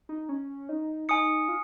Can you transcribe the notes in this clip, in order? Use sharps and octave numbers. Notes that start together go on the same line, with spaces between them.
D#4
C#4
D#4
D#4 G#5 D#6 C#7
F4